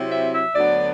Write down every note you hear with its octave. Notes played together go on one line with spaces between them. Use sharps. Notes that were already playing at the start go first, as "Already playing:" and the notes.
Already playing: C3 F#3 C4 E4
E5
E5
D2 D3 F#3 B3 D4 D5